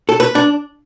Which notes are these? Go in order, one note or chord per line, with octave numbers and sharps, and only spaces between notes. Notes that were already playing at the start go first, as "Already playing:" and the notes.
A4
B4
D4